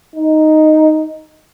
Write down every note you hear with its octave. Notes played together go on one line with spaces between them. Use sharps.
D#4